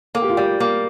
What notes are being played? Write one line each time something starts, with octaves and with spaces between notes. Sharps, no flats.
A#3 A4
G4
F4
G3 G4
A#3